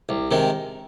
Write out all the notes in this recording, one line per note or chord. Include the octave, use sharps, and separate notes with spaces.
C2
C3 D#3 G#3